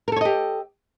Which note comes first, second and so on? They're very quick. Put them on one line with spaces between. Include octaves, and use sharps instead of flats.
A#4 A4 C#5 D#5 G4